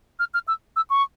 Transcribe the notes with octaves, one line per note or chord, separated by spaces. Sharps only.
F6
F6
E6
E6
C#6